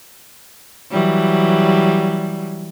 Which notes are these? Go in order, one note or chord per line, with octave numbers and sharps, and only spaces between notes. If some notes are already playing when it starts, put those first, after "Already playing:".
E3 F#3 G3